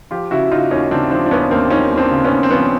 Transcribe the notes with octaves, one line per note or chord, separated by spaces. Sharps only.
F3 F4 G4
C#3 E4 F#4
C#3 D#4 F4
D#2 C#4 D#4
C#3 C4 D4
F3 C4 D4
D4
D#2 B3 C#4
D#2 A#3 C4
F3 C#4 D#4
D#2
C4 D4
C#3
B3 C#4
D#2
C4
F3 B3 C#4